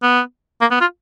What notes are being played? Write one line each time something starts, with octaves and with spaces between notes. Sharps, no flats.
B3
A#3
B3
F4